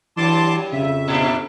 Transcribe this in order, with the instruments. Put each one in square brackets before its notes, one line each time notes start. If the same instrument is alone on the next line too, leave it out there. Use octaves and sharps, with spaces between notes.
[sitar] G2 F#3 [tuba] E3 [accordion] A5 C6 D6
[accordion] F2 E5 [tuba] C#3
[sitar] A#2 D4